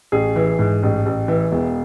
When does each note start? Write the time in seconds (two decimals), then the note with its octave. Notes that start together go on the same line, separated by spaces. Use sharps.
0.12 A1 G#4
0.36 E3
0.59 G#2
0.83 A1
1.06 A1
1.28 E3
1.52 E1